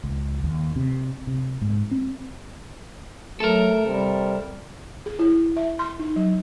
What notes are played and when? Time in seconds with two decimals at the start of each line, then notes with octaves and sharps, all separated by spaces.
0.04 C#2
0.44 D#2
0.76 C3
1.27 C3
1.62 G#2
1.91 C4
3.40 F#3 A3 A4 A#4
3.86 C3 G3
5.06 G#4
5.19 E4
5.57 E5
5.79 C6
5.99 D#4
6.16 F#3